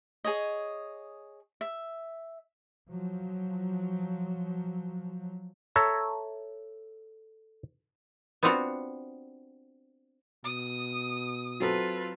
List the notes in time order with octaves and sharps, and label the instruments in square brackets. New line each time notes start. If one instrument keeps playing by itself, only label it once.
[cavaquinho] G#4 C#5 D#5
E5
[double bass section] F3 F#3
[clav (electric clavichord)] A4 C#5 E5 A#5
[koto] B3 C4 D4 F4 F#4
[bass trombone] B2 [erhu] D#6
[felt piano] F#3 C4 A4 [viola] F4 B4